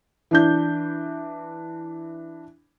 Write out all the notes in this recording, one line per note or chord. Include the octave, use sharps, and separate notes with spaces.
E3 D4 G6